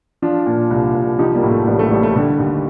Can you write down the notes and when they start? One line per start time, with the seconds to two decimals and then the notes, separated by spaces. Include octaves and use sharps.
0.22 F3 D4 F4
0.46 A#2
0.71 C2
0.95 C2
1.19 F3 D#4 G4
1.35 G3 A#3
1.43 A2
1.51 A3
1.67 A1 G3
1.79 A3
1.91 A1 G3
2.03 A3
2.15 D3 G3
2.39 D#2